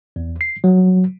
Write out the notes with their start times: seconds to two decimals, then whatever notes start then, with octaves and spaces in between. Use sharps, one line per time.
0.16 E2
0.41 C7
0.64 F#3